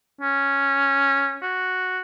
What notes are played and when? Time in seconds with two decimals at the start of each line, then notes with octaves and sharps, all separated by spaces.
0.21 C#4
1.42 F#4